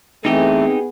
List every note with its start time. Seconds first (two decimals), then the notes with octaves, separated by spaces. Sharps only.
0.25 E3 A3 B3 C4 D#4 G4 G#4